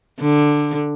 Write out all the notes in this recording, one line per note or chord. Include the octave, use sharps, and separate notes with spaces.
D3